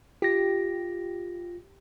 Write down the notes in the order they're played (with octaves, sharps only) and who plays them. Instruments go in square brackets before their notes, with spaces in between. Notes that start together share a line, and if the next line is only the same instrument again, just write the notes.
[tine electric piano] F4 A#6 [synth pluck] G4